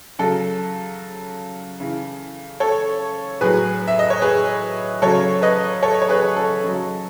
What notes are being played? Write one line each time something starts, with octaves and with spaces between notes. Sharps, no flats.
C#3 F#3 A4
C#3 E3
A4 C#5
A2 F#3 G#4 B4
E5
D#5
C#5
G#4 B4
C#3 F#3 A4 C#5
B4 D#5
A4 C#5
C#5
G#4 B4
A4
C#3 F#3